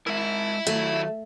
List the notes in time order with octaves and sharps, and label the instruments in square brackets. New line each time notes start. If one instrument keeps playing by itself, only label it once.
[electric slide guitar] G#3 A#4 [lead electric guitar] E4 E5
[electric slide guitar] D#3 F#3 [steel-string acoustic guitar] A3